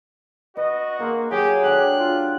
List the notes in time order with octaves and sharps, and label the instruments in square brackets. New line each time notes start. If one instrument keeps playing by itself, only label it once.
[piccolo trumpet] F#4 [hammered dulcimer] B4 [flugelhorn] D#5
[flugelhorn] A#3 [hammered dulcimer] G#4 C6
[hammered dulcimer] F#3 [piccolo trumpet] G4 [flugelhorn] G#4
[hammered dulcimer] D4 G4 A4 [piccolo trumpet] F#6
[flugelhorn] F4